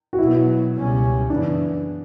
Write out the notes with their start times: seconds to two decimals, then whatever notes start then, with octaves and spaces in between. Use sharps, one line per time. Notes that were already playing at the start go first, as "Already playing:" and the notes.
0.13 F#4
0.18 B2 F#3 B3 E4
0.74 C#2 B2 G3 C#4
1.30 F#2 C#3 E3 B3 D4